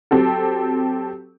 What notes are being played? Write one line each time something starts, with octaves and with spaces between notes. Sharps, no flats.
F#3 C4 G4 A4